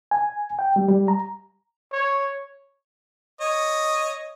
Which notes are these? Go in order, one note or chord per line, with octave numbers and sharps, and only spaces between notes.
G#5
G5
G3
G3
A#5
C#5
C#5 D#5